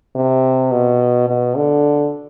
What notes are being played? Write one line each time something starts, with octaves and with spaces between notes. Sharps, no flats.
C3
B2
B2
D3